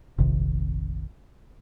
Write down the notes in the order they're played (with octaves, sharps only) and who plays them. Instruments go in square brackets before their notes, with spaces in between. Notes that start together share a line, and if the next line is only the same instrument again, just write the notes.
[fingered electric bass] F1 A#1 C3 D#3